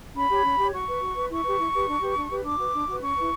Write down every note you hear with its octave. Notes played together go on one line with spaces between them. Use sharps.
C#4 B5
G4 C#5
C#4
G4
C#5
F#4 C#6
B4
F#4
B4
E4 C#6
G4 B4
E4
G4 B4
D4
G4 B4
D4
G4 B4
D4 D6
F#4 B4
D4
F#4 B4
C#4 C#6
E4 B4